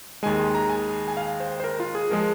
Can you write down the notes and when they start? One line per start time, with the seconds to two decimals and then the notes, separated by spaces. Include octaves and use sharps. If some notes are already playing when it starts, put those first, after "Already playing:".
0.23 D#2 D#3 G#3 G#5
0.39 C6
0.55 A#5
0.69 G#5
1.08 G#5
1.17 F5
1.40 C5
1.60 C5
1.64 A#4
1.80 F4
1.95 G#4
2.10 F3 G#3 A#4